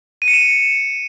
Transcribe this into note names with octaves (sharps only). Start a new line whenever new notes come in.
D#7
C#7
E7